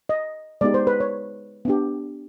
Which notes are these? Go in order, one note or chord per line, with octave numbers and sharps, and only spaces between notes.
D#5
G#3 B3 D#4 G4 D5
C5
B4
C#5
B3 D4 G4